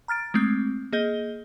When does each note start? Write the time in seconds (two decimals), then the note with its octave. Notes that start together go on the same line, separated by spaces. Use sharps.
0.08 A#5 F6 A6 D7
0.34 G#3 A3 C4 G6
0.92 A#3 G#4 D#5 G6 G7